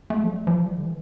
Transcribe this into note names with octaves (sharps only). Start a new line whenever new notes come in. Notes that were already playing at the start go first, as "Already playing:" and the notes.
A3
F3
G3
F3
G3
D3
E3